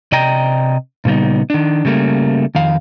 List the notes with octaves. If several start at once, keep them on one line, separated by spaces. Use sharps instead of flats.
C3 D5 D#5 G5 A#5
A#2 C#3 G3 B3 D#4
D#3 D4
C#3 G3 A3 A#3
F2 D#3 F5